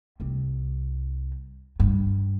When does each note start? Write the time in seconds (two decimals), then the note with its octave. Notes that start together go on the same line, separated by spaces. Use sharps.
0.20 C2 C4
1.80 G2